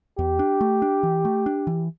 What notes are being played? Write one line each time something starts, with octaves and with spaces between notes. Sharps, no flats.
E2 G4
D4
A3
D4
E3
A3
D4
E3